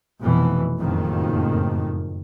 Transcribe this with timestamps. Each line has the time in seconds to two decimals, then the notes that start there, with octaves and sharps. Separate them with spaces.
0.21 F1 B2 E3
0.80 F#1 F2 A2 D#3